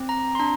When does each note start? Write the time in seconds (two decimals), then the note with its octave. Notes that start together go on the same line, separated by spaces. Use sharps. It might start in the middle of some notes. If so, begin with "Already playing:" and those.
Already playing: C4
0.09 A#5
0.35 C6
0.39 D4 A#5